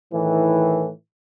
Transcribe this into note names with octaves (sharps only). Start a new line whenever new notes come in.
A2 D#3 E3